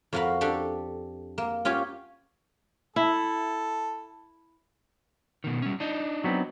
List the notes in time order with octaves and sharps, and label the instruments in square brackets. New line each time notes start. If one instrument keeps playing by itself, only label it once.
[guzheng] F2 F4 F#4 A#4 F5 B5
D4 G4 A4
A#3
C#4 F4 G4 C#5
[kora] E4 [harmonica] A4
[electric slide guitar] B2 D#3
G3 C#4
D4 D#4 D#5
[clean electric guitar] F#3 B3 C4